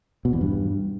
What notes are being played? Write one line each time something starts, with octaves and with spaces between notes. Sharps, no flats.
B2
E2
G2